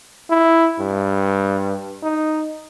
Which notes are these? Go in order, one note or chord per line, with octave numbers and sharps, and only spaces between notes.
E4
G2
D#4